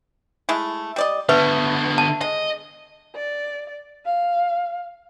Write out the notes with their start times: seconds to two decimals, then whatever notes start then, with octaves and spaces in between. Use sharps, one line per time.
0.49 G#3 A3 E4
0.96 G3 D5 D#5
1.29 D3 A3 B3 B4
1.98 A5
2.21 G#3 D#5
3.16 D5
4.05 F5